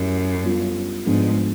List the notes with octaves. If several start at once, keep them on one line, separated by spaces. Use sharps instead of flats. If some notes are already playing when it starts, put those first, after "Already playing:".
Already playing: F#2 A3 C#4 E4 G4
G3 B3 D4 F4
G#2 F3 G#3 B3 D4